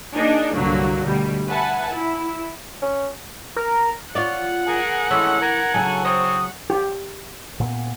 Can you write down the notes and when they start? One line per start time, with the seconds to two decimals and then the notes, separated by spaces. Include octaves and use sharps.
0.14 A#3 D4 D#4 G#4
0.55 C2 G2 D3 F#3 A#3
1.04 D2 B2 G3
1.48 B4 E5 F#5 G#5 A5
1.93 E4
2.82 C#4
3.56 A#4
4.15 F4 C#5 D5 F#5
4.68 G#4 A#4 G#5
5.10 E3 G#3 A3 C#4 E6
5.41 A#4 G#6
5.74 C#3 F#3 A4 G#5
6.05 C4 C5 C#5 D#6
6.70 G4
7.60 A#2 B3